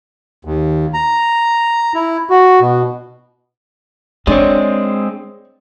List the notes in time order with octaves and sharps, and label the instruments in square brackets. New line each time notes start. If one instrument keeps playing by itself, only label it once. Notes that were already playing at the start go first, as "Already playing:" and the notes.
[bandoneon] D#2
A#5
E4
F#4
B2
[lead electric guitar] G#3 C4 [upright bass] D4 [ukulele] C#5 D5